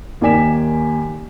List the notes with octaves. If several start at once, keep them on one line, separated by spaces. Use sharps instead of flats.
D#2 A#3 D5 G#5 B6 E7